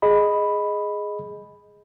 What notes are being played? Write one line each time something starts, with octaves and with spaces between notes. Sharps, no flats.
G#4 D#5 B5